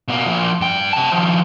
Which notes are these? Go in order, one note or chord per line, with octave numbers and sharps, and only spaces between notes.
B2 A#3
F3 A#3
G2 G5
C3 A5
D#3 F3